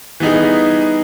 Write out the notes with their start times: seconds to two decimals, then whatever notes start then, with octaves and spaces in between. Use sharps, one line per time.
0.20 E3 G3 B3 D#4 G#4